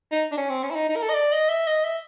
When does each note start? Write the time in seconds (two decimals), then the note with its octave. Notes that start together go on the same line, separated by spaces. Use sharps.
0.12 D#4
0.32 D4
0.37 C#4
0.50 C4
0.64 C#4
0.71 E4
0.76 D#4
0.89 D#4
0.96 A#4
1.02 A4
1.09 D#5
1.14 D5
1.32 D#5
1.49 E5
1.67 D#5
1.84 E5